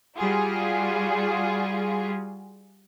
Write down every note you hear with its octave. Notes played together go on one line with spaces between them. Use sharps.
G3 F4 F#4 G#4